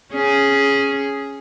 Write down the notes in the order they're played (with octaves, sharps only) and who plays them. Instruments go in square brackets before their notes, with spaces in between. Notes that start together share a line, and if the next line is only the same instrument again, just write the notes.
[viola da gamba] C#4 G#4